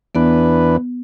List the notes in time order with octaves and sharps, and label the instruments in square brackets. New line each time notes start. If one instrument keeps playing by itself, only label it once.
[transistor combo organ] E2 E3 D4 B4 [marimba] B3